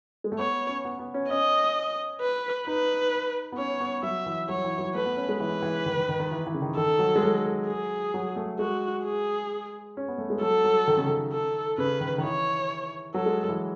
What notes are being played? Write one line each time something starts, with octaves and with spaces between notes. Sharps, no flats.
G#3
A3
B3 C#5
C#4
B3
B3
C#4
C#4 D#5
B4
D#4 B4
B3
C#4 C#5
B3
F#3 E5
E3
F#3 C#5
E3
F#3
A3 B4
B3
C#4
G#3
E3 B4
E3
D#3
D#3
D#3
D#3
E3
E3
C#3
D#3
D#3 A4
F#3
G#3
F#3
G#4
F#3
A3
G#3 F#4
G#4
C#4
B3
A3
G#3
F#3 A4
F#3
D#3
C#3
D#3
A4
C#3 B4
D#3
D#3
E3 C#5
F#3 A4
G#3
F#3
E3